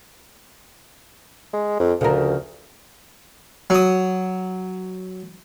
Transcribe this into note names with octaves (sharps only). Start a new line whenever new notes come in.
G#3
F2
D2 C#3 F3 A#4
F#3 D#6